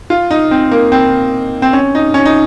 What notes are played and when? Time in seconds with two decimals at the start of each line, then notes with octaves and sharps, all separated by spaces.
0.10 F4
0.31 D#4
0.51 C4
0.72 A#3
0.92 C4
1.62 C4
1.73 C#4
1.95 D#4
2.14 C#4
2.25 D#4